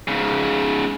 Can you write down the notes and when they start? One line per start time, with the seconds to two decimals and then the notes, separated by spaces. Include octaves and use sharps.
0.08 G#2 C#3